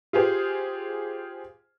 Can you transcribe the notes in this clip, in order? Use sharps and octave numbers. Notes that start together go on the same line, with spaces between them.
F4 G4 G#4 C5